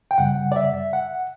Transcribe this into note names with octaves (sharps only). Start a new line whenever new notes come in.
G5
F#2 C#3 G3 F#5
D5
E5
F#5